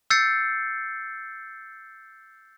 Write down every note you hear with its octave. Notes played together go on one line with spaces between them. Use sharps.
E6 G6 A6 C7 C#7